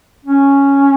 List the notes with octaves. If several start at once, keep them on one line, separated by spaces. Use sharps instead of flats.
C#4